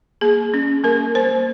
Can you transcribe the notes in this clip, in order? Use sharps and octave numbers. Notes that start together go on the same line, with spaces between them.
A#3 G#4
C#4
A#3 A#4
A#3 C5